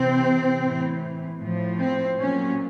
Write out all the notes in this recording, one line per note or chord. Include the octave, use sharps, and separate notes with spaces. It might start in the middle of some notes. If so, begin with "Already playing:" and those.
Already playing: C3 E3 C4
A2 E3
A2 F3
C4
A#2 F#3 C#4